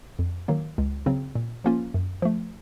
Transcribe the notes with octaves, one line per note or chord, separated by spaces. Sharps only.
F2
D#3 F#3 A#3
C#2
C#3 F#3 C4
A#2
F3 A#3 C#4 F4
F#2
F3 A3